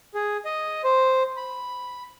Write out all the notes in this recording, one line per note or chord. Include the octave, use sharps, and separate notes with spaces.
G#4
D#5
C5
B5